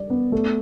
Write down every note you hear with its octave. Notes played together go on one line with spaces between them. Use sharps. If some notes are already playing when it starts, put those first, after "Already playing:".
Already playing: G3 D5
B3
A3